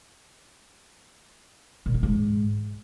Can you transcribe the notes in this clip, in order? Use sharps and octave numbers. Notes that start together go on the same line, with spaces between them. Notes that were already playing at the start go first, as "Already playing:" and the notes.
A#2
D#3
G#2